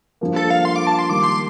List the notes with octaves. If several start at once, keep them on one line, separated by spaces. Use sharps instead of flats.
G2 F3 A#3
A4
F5
C6
D6
A5
C6
D#3 G3 A#3 D6
C6